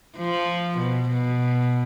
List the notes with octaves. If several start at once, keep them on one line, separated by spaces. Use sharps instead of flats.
F3
B2
B2